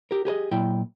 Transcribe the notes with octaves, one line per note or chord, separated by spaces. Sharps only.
G4 A#4
G4 G#4 B4 D#5
A#2 F#3 E4 G5